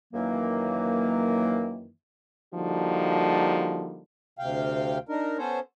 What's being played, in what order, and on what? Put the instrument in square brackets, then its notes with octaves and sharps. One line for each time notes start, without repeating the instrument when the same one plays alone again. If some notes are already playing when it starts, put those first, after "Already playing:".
[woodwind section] F#2 D#3 E3 F#3 A#3
[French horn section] D3 F3 G3 A#3 D#4 F#4
[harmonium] D2 C3 F5 G5
D4 D#4 A#4
B3 C#4 A4 C5 C#5